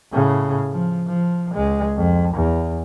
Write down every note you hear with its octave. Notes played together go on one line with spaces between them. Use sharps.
A2 C#3
F3
F3
C#2 G#3
F2
E2